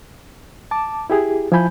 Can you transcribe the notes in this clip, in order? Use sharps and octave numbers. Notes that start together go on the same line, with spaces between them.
A5 D6
E4 G4 G#4
F3 E4 C5 G#5 B5 G6